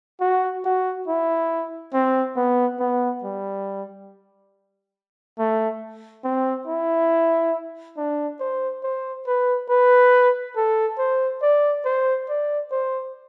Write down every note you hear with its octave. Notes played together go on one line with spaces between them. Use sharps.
F#4
F#4
E4
C4
B3
B3
G3
A3
C4
E4
D4
C5
C5
B4
B4
A4
C5
D5
C5
D5
C5